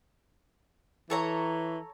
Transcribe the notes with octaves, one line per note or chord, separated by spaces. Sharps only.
E3 A4 C#5 A#5